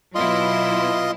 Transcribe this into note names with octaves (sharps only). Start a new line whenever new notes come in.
B2 F#3 E4 F4 D#5 C6